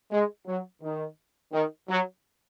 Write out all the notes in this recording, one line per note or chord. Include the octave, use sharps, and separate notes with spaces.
G#3
F#3
D#3
D#3
F#3